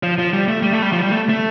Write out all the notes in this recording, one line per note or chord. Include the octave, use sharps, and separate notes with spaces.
F3
F3
G3
A3
G3
A3
G3
F3
G3
A3
A3